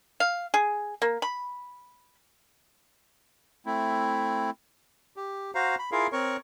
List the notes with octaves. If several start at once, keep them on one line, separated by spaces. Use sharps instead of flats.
F5
G#4
A#3
B5
A3 C4 E4
G4
F#4 C5 F5 A#5
B5
E4 F4 G#4 A#4 F5
C4 A#4 C#5 C#6